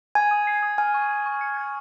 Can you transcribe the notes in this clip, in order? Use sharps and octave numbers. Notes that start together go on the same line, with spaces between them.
G#5 G#6
D#6
C7
D#6
G#5 F6
C#6
G#6
C#6
C#7
G#6